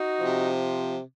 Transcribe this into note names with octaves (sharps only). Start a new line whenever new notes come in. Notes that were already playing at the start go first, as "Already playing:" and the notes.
Already playing: D#4 F#4
C3 F3